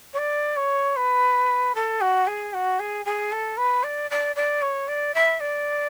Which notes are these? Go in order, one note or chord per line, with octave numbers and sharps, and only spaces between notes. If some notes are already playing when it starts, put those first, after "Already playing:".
C#5
D5
C#5
B4
A4
F#4
G#4
F#4
G#4
G#4
A4
B4
D5
D5
D5
C#5
D5
E5
D5